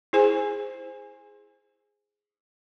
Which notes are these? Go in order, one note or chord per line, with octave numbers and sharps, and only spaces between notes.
E4 G#4 C5 G#5